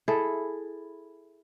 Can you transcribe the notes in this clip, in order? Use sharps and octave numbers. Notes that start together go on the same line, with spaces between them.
E4 G#4 A4